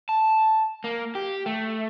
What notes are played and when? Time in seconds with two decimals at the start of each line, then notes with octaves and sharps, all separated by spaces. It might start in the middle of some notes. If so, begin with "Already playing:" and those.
0.09 A5
0.84 A#3
1.15 G4
1.46 A3